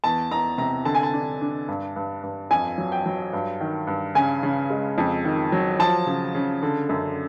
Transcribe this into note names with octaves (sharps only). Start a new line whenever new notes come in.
E2 A5
E2 A#5
C3 A#5
D3 A5
G#5
A5
D4
D4
G2
G2
G2
F2 G#5
F#3
G5
F#3
G2
D#3
G2
C#3 G#5
C#3
G#3
F2
D#3
F#3
F3 A5
C#3
C#3
D3
F#2